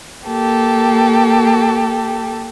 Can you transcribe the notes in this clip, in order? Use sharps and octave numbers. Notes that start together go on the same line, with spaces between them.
A#3 G4 A4